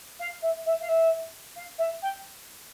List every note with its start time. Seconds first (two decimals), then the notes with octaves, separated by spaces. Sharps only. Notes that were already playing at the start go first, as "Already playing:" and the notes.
0.19 F5
0.42 E5
0.65 E5
0.80 F5
0.88 E5
1.56 F5
1.78 E5
2.02 G5